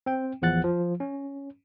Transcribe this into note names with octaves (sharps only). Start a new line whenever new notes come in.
C4 G5
A1 E2 F3 F#5 F#6 A6
F3
C#4